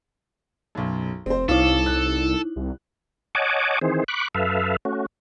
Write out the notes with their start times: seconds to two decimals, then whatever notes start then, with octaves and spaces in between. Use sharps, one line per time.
0.75 B1 F#2
1.26 F1 C4 C5
1.49 C2 D#4 E4 A4 F5
1.86 F#6
2.56 C2
3.35 C#5 D#5 F#5 G#5 A5 D6
3.81 D#3 E3 C4 G#4 C5
4.08 B5 C#6 D6 F#6
4.35 F#2 A4 B4 E5 F5
4.85 A3 C#4 F#4